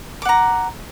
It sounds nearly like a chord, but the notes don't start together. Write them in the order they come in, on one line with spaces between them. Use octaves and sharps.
D6 F#5 A#5